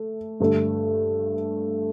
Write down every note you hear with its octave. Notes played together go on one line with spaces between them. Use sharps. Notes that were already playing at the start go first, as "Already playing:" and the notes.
Already playing: A3
G2 D3 A3